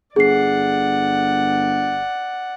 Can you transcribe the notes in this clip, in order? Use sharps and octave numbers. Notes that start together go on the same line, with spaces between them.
G1 G#4 D5 F#5 C7